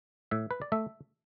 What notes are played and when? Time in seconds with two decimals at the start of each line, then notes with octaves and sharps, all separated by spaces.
0.31 A2 E5
0.51 B4
0.62 D5
0.72 A3 E5